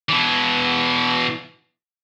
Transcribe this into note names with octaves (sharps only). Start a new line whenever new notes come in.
B2 E3